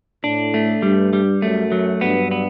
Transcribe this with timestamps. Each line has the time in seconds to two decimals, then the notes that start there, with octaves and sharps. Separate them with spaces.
0.23 A2 D4
0.54 A3
0.82 G2 G3
1.13 G3
1.42 F#2 A3
1.72 F#3
2.01 G2 B3
2.31 B3